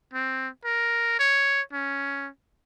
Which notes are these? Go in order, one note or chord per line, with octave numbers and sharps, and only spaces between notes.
C4
A#4
C#5
C#4